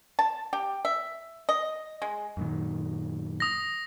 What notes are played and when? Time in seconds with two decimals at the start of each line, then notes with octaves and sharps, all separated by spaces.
0.19 A5
0.53 G4
0.85 E5
1.49 D#5
2.02 G#3
2.37 F#2 A#2 D#3
3.40 D#6 A#6